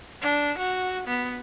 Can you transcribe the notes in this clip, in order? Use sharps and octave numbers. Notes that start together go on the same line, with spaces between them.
D4
F#4
B3